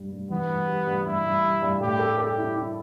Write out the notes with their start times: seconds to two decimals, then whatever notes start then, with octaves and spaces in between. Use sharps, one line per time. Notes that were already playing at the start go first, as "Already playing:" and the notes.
Already playing: G2 G3
0.12 G2
0.30 E3 B3
0.48 G2
0.67 G3
0.86 G2
1.05 G2 E4
1.25 G2
1.43 G2
1.62 G2
1.80 A2 G4
1.99 A4
2.18 G4 A4
2.38 E4
2.56 E4